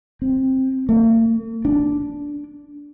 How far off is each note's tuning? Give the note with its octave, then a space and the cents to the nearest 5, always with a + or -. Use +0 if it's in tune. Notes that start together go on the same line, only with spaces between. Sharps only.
C4 +10
A#3 -45
D4 -15